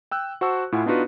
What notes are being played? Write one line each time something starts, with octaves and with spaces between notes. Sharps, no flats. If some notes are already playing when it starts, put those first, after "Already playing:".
G5 E6 F#6
F#4 C5 F#5 A5 C#6 E6
A2 E4 F4 F#5 G#5
B3 D4 D#4 F4 F#4 B4